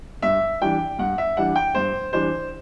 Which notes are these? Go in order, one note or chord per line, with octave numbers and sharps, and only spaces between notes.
G2 E5
E3 G3 D4 G5
G2 F#5
E5
E3 G3 D4 F#5
G5
G2 C5
E3 G3 D4 C5